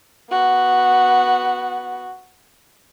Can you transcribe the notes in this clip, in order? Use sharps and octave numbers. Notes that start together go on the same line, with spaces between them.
B3 F#4